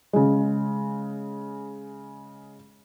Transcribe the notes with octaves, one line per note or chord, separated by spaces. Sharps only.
C#3 G#3